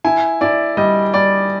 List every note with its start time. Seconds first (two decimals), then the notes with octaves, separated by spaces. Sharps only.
0.04 E4 G#5
0.41 E4 D5
0.77 G3 D#5
1.14 G3 D5